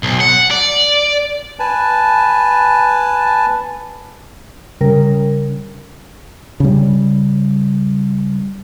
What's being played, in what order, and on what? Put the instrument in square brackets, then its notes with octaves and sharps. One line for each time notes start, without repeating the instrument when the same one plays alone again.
[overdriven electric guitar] B1
F#5
D5
[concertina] B4 G#5 A5
[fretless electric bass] C#3 [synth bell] G3 A#4
[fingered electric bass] C#3 G3